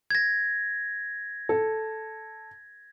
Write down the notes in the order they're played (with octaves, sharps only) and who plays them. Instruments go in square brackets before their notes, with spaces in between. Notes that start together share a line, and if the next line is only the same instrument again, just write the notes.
[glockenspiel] G#6 A#6
[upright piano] A4